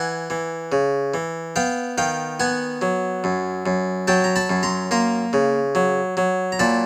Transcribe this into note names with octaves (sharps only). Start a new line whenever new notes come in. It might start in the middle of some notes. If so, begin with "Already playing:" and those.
Already playing: E3 F#5 G#5
E3
C#3
E3
B3 F5 G5
D#3 F5 G5
B3 F#5 G#5
F#3
F#2
F#2
F#3 G5 A5
A#5
A5 B5
F#2
A#5 C6
A#3 A#5 C6
C#3
F#3
F#3
A#5
A#2 A5 B5